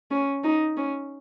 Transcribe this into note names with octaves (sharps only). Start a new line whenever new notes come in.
C#4
D#4
C#4